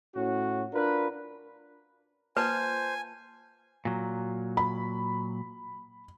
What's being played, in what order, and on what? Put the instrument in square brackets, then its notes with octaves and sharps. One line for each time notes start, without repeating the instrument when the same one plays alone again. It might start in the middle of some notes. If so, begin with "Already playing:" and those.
[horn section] A2 C#4 F#4
D4 F4 A#4 B4
[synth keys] A#3 F4 A5 [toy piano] B4 [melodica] C5 [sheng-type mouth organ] G#5
[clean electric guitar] A#2 F#3
[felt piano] B5